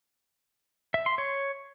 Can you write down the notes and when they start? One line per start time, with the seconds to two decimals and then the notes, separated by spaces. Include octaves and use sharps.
0.94 E5
1.06 C6
1.18 C#5